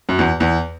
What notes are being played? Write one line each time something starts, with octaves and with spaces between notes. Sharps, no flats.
F#2
E2
E2